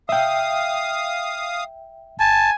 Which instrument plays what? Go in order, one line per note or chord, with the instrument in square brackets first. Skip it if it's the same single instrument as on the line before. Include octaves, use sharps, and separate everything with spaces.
[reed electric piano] E5 G5 [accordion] F5 D#6
[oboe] G#5 [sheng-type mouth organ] A5